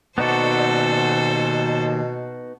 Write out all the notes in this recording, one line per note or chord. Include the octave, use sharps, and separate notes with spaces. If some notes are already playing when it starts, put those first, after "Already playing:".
D#2 B2 B3 D#4 F#4 A4 C5 D5